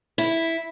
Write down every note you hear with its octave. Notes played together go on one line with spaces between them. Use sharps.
E4